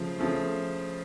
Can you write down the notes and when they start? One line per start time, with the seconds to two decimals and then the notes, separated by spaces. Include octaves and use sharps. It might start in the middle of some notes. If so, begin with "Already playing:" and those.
Already playing: C#3 F3 A3
0.19 C#3 F3 A3